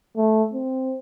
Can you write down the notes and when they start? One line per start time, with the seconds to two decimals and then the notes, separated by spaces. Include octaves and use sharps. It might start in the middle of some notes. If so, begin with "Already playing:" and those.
0.17 A3
0.53 C4